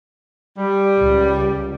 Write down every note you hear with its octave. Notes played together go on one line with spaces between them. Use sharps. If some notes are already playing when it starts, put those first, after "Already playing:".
G3
C#2